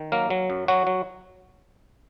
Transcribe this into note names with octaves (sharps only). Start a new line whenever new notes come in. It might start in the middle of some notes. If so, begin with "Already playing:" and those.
Already playing: D#3
F#3 A#3 A#4
F#3
F#2
F#3 F#4
F#3